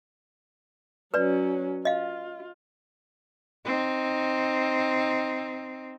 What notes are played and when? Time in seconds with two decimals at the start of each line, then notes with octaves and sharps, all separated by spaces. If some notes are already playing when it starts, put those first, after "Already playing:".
1.14 F#3 C#4 B4 D5
1.85 F4 D#5 F5
3.65 C4 D#4